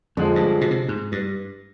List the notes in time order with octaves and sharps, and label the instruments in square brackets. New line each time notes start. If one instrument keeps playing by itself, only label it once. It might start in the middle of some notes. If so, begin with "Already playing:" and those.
[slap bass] F2 [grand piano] D3 F3 G#3
[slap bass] G2
B2
C3
G#2
G2